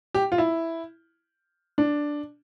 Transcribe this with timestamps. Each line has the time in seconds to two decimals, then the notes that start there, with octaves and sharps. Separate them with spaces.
0.14 G4
0.32 F4
0.38 E4
1.78 D4